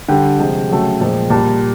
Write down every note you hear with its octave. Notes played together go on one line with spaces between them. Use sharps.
D3 G3 G5
C3 F3 G#3
C#3 F#3 A3
A#2 F3 G#3
A#2 G3 A5